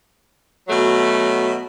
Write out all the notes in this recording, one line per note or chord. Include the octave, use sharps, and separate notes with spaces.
B2 F#3 A3